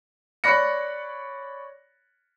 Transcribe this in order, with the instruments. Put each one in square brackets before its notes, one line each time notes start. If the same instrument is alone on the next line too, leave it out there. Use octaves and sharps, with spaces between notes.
[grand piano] C#5 D5 B5 F#6 A#6 C#7